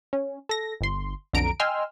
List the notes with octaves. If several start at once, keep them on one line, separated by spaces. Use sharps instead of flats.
C#4
A4 A#6
G1 C6
B1 F2 D3 A#5 D7
D#5 G5 G#5 C6 E6 F6